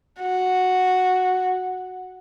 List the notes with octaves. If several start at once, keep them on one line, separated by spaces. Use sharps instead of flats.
F#4